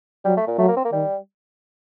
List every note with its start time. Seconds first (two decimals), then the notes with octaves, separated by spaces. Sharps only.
0.25 F#3 G3
0.37 A3
0.48 A#2
0.58 F#3 A3
0.68 A#3
0.76 C4
0.85 A#3
0.93 D#3 G3